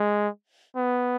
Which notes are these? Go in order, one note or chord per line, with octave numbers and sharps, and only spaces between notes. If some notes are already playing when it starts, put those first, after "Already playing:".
Already playing: G#3
B3